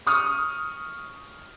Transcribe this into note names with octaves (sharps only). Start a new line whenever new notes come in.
C#6 D#6 F6